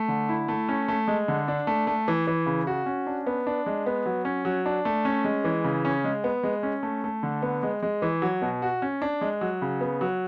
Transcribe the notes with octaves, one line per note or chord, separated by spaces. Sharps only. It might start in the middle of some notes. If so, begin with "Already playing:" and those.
Already playing: A3
D3
E4
A3
C#4
A3
G#3
D3
D4
A3
A3
E3
E3
C#3
F#4
C#4
D4
B3
D4
G#3
B3
F#3
C#4
F#3
D4
A3
C#4
G#3
E3
C#3
C#4
G#3
B3
G#3
C#4
A3
A3
D3
B3
G#3
G#3
E3
F#3
B2
F#4
C#4
D4
G#3
F#3
C#3
B3
F#3